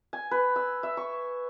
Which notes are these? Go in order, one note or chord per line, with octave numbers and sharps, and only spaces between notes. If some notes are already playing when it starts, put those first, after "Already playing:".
G#5
B4
E6
E5
C#6